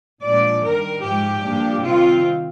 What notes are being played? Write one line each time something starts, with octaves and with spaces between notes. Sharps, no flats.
A#2 F3 G#3 D4 D5
G2 D#3 G3 A#4
G#2 F3 G#3 G4
G2 F3 A#3 D4
C3 D#3 G3 C4 F4